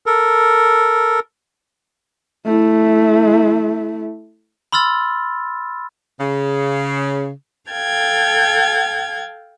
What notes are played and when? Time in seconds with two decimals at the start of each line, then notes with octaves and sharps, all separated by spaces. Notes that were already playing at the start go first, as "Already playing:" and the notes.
0.06 A4 A#4
2.46 A3 E4
4.72 B5 C6 E6 F6 A6
6.19 C#3
7.70 A4 F5 G5 G#6